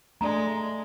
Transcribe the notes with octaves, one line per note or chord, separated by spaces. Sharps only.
G#3 A3 D4 D5 A#5